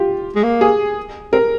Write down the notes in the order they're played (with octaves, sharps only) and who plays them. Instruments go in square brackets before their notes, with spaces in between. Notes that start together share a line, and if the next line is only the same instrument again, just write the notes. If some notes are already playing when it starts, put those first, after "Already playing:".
Already playing: [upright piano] F4 G4
[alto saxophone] G#3
A#3
[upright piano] G#4
[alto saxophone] C4 [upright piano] A#4